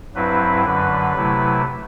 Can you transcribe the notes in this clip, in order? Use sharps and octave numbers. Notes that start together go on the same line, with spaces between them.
G2 F#3 C4 E4 B4
F#2 D3 F#3 B4
C3 F#3 A3 E4